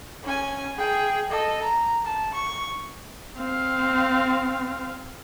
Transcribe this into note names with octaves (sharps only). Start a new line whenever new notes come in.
C#4 G#5
G#4 G5
A4 D#5
A#5
A5
C#6
C4 F5